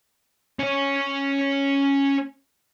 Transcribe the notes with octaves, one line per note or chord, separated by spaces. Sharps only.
C#4 C#5